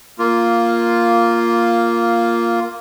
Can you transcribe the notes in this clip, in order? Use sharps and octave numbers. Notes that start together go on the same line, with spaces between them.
A#3 F4